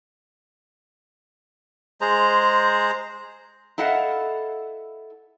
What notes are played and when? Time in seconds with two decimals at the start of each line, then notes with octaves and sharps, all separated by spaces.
2.01 G#3 G#4 C5 A#5
3.78 E4 A4 D#5 F5 F#5